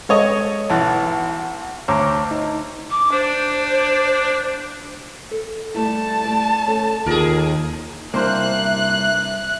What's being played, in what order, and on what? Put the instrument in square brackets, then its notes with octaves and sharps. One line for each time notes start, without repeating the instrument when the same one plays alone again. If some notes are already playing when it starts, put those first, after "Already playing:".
[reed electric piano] G#3 [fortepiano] A4 C#5 D#5
[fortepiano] B1 E3 [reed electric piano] A5
[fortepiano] D2 [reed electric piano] C#5 A#5 D6
[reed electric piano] D#4
[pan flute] D6
[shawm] D4 [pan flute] C5
[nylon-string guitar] A4
[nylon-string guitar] G3 A3 E4 [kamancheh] A5
[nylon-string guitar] A3 D5
A3 C#4 A4
[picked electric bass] D#2 [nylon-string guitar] F4 [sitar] G#4 A#4
[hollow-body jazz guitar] C2 [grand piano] A#3 D4 C5 [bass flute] E5 [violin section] F#6